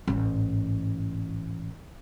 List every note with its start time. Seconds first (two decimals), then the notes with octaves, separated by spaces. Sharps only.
0.07 A1 G#2